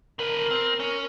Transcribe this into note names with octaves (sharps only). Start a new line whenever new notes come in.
D3 A#4 B4
C4
C#4